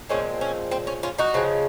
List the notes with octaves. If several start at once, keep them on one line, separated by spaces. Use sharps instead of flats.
A#2 F3 G#3 C4 C#4
C#4
C4
C#4
C#4 F4
D#4 F#4
C#3 F3 G#3